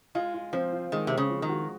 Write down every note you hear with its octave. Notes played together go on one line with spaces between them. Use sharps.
G#3 F4
F4
F3 C4
F4
D#3 G#3
C3 C4
C#3
F3
D#3
F#4